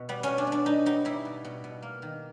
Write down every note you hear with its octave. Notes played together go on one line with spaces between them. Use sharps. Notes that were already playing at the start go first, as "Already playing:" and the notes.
Already playing: B2
G3 B3
B2 C#4
D4
B3
D4
B3 D#4
G3 D#4
G3 E4
B2
B2
B2
A#3
D#3